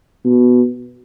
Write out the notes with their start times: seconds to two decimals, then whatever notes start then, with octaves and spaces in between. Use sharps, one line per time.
0.25 B2